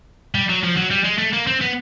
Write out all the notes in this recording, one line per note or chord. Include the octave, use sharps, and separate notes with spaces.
G3
F#3
F3
F#3
G3
G#3
A3
A#3
C4
B3